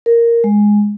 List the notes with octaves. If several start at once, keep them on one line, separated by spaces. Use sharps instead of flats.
A#4
G#3